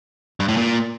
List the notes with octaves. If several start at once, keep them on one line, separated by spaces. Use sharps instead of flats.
G2
A2
A#2